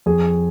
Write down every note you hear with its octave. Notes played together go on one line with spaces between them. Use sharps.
F2 G#4